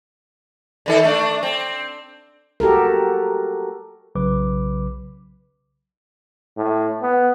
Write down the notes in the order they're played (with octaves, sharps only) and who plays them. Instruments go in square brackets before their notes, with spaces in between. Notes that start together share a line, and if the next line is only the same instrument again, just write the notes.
[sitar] D3 D#3 A4
A3 D4
C4
[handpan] F#4 G4 A4 A#4
[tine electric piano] B1 C#3 F#3 B4 D6
[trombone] A2
B3